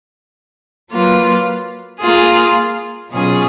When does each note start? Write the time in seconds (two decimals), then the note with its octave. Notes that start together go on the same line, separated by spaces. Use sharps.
0.90 F#3 A#3 F4 B4
1.99 A#3 F4 G#4
3.10 B2 F#3 C#4 F4 G#4